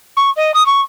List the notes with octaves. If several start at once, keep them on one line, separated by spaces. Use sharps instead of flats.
C#6
D#5
D#6
C#6